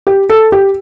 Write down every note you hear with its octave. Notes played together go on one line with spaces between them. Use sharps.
G4
A4
G4